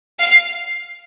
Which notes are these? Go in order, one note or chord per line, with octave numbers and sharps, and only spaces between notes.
F5